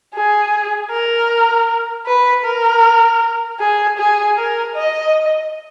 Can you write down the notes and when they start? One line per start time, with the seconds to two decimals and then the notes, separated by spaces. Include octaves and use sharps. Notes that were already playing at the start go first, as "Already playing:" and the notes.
0.15 G#4
0.91 A#4
2.06 B4
2.45 A#4
3.60 G#4
3.98 G#4
4.37 A#4
4.75 D#5